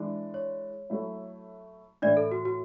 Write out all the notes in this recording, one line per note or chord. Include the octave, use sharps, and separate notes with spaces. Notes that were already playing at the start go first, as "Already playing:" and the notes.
Already playing: E3 G#3 D4
C#5
F#3 A3 E4
A2 E3 A3 D4 E4 D5
A4
F#4
F#4